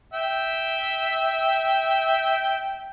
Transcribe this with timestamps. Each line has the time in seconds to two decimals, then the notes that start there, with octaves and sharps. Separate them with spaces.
0.14 E5 G5